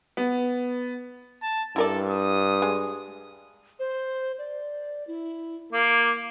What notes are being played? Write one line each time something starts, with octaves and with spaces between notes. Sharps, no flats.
B3
A5
G2 E4 A4 A#4 D5
D#6
G#3
C5
D5
E4
A#3 D6